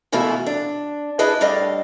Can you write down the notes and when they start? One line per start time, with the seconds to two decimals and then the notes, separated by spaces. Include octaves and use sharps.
0.12 G#2 B2 E3 A3 E4 F4
0.46 D4
1.19 D4 E4 G#4 B4 D#5
1.41 A2 G3 D4 A4 D#5 F5